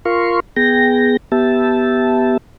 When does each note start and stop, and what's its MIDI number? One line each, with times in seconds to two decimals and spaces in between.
0.05 0.40 65
0.05 0.40 70
0.05 0.40 77
0.05 0.40 84
0.05 0.40 85
0.56 1.17 59
0.56 1.17 68
0.56 1.17 79
0.56 1.17 94
1.32 2.37 59
1.32 2.37 67
1.32 2.37 76
1.32 2.37 81